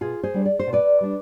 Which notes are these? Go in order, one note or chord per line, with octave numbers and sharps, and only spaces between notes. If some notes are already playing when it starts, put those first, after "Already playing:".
B2 F4 G#4
G#4 C5
G3 D4
D5
C5
B2
B4 D5
G3 D4